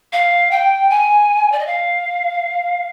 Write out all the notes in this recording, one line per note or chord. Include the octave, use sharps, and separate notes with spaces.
F5
G5
G#5
D5
D#5
F5